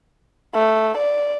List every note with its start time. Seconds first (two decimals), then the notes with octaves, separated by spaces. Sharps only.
0.54 A3
0.98 D5